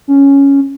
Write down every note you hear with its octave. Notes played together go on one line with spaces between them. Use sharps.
C#4